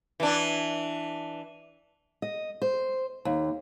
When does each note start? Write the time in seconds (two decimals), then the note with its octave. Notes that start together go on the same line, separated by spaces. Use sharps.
0.20 E3 D4
2.22 D#5
2.62 C5
3.25 D#2